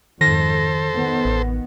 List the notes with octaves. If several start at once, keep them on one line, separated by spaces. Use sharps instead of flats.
F2 G#2 D#3 A4 C5 A#6
D#3 B3
A1